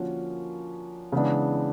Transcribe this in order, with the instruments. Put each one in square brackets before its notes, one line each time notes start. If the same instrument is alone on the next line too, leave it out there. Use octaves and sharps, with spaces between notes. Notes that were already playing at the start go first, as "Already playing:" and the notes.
Already playing: [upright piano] D3 F3 A#3 C#4 F#4
C#3 E3 G#3 B3 D4